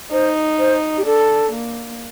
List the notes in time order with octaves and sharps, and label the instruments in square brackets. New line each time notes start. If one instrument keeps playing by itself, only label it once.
[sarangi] D#4 [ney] C5
[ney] C5
G4
[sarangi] D4 [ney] A4
[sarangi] A#3